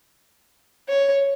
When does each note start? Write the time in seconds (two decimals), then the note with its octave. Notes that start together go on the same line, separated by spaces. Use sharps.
0.89 C#5